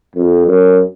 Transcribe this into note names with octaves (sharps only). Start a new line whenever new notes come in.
F2
F#2